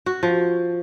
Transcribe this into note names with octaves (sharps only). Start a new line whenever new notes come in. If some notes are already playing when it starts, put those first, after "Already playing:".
F#4
F3